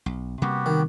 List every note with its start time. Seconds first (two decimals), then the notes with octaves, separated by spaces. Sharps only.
0.06 B1
0.42 C3 G3 A#3 B3 F#4 G4
0.66 D#3